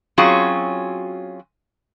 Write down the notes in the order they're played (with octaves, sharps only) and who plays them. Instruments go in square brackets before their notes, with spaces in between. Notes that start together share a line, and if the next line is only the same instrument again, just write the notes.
[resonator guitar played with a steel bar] F#3 C4 C#4 F4 F#4 G#4